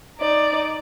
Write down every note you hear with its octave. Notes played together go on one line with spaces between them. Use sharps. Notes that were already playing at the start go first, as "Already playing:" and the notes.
D#4 D5